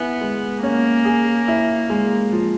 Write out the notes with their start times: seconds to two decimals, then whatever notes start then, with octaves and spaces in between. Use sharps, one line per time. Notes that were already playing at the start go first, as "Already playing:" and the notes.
Already playing: B3 E4 G#4
0.21 G#3
0.63 A#3 C#4
1.05 G#4
1.48 E4
1.90 G#3
2.32 F3